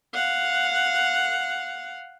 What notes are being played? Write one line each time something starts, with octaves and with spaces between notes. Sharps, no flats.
F5 F#5